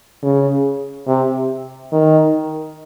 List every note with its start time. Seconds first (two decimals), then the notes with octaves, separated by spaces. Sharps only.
0.23 C#3
1.08 C3
1.92 D#3